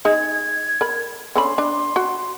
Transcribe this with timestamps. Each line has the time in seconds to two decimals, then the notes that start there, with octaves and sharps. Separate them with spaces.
0.05 D#4 G#4 G#6
0.81 A#4 B5
1.35 D3 C#4 B5 C6
1.58 D4
1.96 F#4